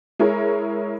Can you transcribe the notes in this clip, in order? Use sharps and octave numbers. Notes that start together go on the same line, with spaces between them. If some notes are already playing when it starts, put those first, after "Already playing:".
G#3 E4 G#4 A#4 C#5